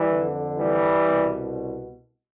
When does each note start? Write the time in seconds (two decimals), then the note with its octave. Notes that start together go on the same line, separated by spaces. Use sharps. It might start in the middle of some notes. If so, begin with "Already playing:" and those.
Already playing: E3 G3
0.09 F2 D3
0.59 E3 G3
1.08 C2 B2